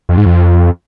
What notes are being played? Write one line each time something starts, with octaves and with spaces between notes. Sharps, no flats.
F2
G#2
F2